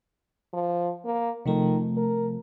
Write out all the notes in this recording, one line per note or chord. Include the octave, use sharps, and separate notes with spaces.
F3
A#3
C3 D#3 F3 A3
A#4